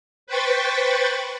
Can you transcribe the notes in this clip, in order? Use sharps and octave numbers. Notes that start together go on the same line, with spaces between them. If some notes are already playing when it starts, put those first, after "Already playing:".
B4 C5 G5 B5 C#6 A6